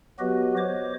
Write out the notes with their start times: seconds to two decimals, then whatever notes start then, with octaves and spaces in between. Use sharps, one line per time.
0.20 F#3 B3 F#4 G4 B4 D#5
0.57 C5 C#5 D#5 D6